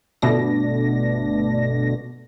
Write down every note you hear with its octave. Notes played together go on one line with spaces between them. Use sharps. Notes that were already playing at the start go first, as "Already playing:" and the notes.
G1 B2 A3 D4 A#6